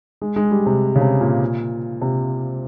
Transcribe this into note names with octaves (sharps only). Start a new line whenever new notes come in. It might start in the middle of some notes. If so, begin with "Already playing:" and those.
G#3
G#3
G3
C3
C#3
C3
A#2
C3